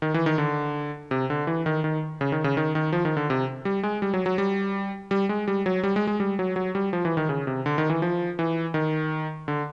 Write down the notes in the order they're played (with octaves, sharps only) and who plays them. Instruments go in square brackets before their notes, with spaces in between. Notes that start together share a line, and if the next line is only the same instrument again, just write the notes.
[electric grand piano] D#3
E3
D#3
D3
C3
D3
E3
D#3
D#3
C#3
D#3
C#3
D#3
D#3
F3
D#3
D3
C3
G3
G#3
G3
F#3
F#3
G3
G3
G#3
G3
F#3
G3
G#3
G#3
G3
F#3
F#3
G3
F3
E3
D#3
C#3
C3
D3
D#3
E3
F3
E3
D#3
D3